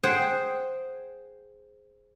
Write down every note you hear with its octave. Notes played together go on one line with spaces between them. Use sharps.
G#4 C5 F#5 G5